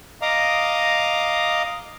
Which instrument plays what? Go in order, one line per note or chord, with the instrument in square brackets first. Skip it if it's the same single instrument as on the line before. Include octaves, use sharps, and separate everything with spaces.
[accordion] D#5 F5 A#5 D6 D#6